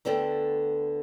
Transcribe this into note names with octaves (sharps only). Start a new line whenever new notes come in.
D2 D3 B3 A4 G5